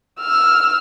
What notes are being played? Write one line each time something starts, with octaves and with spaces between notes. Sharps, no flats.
E6 F6